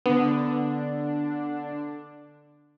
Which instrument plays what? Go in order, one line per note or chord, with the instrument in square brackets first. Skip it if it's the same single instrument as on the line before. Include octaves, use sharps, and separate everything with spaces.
[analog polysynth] D3 D4 [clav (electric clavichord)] B3